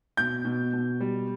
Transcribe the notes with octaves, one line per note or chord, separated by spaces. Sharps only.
B2 G6
B2
B2
G3